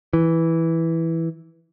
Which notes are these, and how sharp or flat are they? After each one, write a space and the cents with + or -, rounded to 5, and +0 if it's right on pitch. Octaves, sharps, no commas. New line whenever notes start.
E3 -5